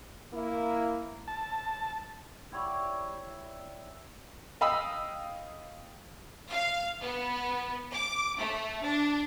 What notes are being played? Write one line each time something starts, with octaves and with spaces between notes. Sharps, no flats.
A#3 E4
A5
E4 G4 C#5 D5
D#5 F5 G5 B5 D#6 E6
F5
B3
D6
A3
D4